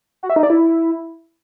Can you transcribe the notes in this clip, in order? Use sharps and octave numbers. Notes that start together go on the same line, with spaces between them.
F#4
E5
D#4
D5
E4